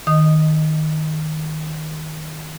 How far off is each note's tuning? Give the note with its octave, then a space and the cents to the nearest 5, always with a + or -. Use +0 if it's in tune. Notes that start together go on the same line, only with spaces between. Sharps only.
D#3 +0 D#5 -10 D#6 -10